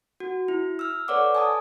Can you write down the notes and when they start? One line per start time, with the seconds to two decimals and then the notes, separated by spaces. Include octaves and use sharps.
0.20 F#4
0.48 E4
0.79 E6 F6
1.08 A4 B4 C#5 D5 F#5 D6
1.35 G#5 A5 D#6